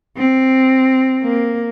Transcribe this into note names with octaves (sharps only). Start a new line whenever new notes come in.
C4
A#3